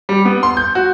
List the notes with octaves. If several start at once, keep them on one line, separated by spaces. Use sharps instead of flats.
G3
B3
C6
G6
F#4